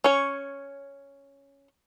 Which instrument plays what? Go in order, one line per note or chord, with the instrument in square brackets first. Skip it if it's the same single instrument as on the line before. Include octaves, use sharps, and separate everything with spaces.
[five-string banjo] C#4 C#5